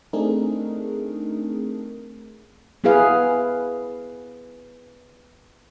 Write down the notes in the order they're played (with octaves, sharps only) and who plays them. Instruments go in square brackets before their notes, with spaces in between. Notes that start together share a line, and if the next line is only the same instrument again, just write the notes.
[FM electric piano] A3 C4 D4 D#4 G#4 A#4
[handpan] B3 E4 G#4 B4 F5